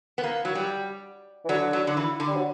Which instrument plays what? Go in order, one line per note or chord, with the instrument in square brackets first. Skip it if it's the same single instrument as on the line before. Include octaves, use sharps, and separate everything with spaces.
[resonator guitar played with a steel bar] B3
A#3
F#3
G3
[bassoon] E3
[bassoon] D3 [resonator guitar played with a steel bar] F#3
[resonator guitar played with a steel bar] F#3
D3
E3
D3
[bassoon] G3
F#3